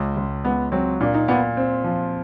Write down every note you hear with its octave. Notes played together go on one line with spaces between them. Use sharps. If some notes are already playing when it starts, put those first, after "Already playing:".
Already playing: C#2 C#4
C#2
C#2 B3
F#3 C4
A#2 D4
D#4
A#2 B3
C4
F3